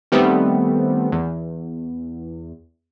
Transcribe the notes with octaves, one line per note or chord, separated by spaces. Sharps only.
D#3 G3 A3 B3 C4
E2